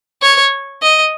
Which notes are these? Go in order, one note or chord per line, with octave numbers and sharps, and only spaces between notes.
C#5
D#5